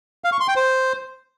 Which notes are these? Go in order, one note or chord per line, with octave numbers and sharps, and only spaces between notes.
F5
C#6
C6
G5
C5